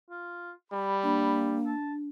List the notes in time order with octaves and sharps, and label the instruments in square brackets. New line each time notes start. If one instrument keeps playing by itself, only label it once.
[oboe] F4
[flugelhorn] G3 [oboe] B5
[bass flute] A#3 [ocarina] D4
[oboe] A5